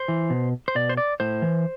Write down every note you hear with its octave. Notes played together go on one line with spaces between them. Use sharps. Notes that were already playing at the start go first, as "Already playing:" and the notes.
Already playing: C5
E3
B2
C5
B2 D5
C5
D5
A2 C5
E3